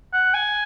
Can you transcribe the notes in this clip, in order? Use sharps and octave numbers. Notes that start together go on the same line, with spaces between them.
F#5
G#5